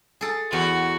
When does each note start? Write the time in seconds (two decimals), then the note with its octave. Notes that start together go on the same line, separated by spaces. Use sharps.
0.21 G#4 A4
0.53 E2 F#4